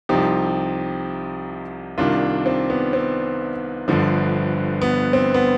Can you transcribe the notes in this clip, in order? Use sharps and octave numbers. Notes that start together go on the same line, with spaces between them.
C2 C3 F3 D#4 G4
C2 C3 D#3 D4 F4
C4
B3
C4
G1 G2 D3 F3
B3
C4
B3